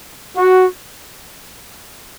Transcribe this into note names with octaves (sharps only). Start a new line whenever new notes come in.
F#4